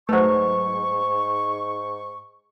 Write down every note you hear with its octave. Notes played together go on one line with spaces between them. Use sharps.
G#2 F#3 A3 B4 C5 C#6